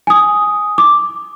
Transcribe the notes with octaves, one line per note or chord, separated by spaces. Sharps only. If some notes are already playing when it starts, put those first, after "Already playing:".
G#5 D#6
D6